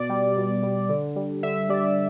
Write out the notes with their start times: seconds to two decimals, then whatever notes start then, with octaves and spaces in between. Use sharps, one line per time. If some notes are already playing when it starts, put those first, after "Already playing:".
Already playing: B2 D5
0.09 G3
0.37 B2
0.63 G3
0.89 D3
1.16 G3
1.43 D3 E5
1.69 G3 D5